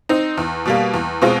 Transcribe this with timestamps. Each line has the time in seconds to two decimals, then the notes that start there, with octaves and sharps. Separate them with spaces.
0.09 C4 D#4
0.37 E2
0.66 B2 G3 A#3
0.94 E2
1.22 B2 G#3 C4 F4